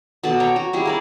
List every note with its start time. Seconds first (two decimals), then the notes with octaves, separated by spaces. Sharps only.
0.23 B2 A4 D5 A5
0.40 C#5 G5 A#5
0.56 F#4
0.73 G3 E4 G#4
0.85 A#3 A#4 D5